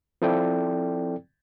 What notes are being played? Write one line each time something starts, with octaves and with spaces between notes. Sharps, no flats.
F3 C4 E4 A4 D5 G5